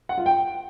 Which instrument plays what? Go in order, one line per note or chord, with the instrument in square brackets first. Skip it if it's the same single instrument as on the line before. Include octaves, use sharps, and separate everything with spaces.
[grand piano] F#5
F4
G5